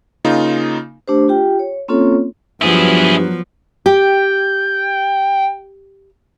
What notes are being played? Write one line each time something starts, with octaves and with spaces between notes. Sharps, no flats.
C#3 A#3 D#4 F4
A3 D4 G4 C5
F4 G4 G5
C#5
A#3 C4 C#4 F4 A4 C#5
G2 F3 F#3 B3 E4 G#4
G4 G5